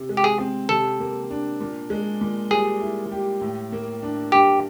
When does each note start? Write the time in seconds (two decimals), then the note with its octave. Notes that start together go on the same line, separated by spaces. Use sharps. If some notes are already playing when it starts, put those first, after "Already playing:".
Already playing: C3
0.09 G#3
0.17 G4
0.24 G#4
0.39 C4
0.69 C3 A4
1.00 A#3
1.31 D4
1.61 A#2
1.90 G#3
2.21 A#2
2.51 G3 G#4
2.81 E4
3.11 G4
3.41 A2
3.72 A#3
4.03 D4
4.32 G2 G4